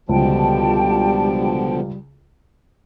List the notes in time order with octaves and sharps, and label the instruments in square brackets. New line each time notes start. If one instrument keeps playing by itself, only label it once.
[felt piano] C#2 [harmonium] B2 D3 F3 [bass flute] G3 [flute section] G5 A5